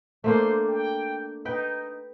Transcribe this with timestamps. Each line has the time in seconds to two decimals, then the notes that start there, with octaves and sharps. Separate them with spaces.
0.24 A3 A#3 D4 C5
0.68 G5
1.45 D#4 B4 G5